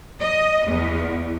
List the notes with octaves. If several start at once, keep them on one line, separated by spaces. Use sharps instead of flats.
D#5
E2